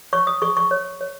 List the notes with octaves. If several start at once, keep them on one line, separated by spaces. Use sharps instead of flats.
C#5 C#6
D#6
G#4 C#6
C#6
C#5
C#5